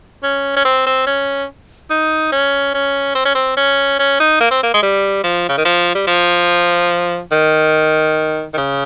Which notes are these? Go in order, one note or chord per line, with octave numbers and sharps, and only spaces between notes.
C#4
C#4
C4
C4
C#4
D#4
C#4
C#4
C4
C#4
C4
C#4
C#4
D#4
A#3
C4
A#3
G#3
G3
F3
C#3
D#3
F3
G3
F3
D#3
D#3
C#3